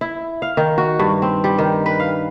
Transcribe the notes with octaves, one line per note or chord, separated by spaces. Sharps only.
E4
F5
D#3
F#4
G2
C4
G3
D#3
B4
F5